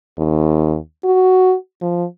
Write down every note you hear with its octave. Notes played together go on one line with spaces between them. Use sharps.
D#2
F#4
F3